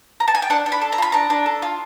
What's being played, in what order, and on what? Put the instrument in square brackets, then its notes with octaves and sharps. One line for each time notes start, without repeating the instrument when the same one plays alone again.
[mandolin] A#5
A5
G#5
G5
D4 F#5
D4
B5
A4
A#5
F4 B5
D4 A#5
D4
A4
F4